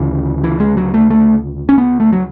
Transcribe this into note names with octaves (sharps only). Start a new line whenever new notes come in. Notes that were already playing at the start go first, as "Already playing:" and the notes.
Already playing: D2 C#3 E3
E3
G#3
F#3
A3
A3
C#4
B3
A3
F#3